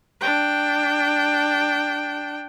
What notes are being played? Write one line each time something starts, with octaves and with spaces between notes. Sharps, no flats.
D4 G5